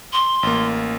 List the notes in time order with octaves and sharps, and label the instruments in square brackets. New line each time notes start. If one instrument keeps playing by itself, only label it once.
[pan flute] C6
[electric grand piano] A1 A#3